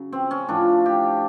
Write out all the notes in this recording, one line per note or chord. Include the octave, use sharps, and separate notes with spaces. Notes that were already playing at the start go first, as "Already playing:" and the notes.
Already playing: C#3 F#3
C4
C#4
A2 F3 D4
G4